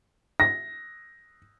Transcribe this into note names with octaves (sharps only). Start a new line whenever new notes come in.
A#6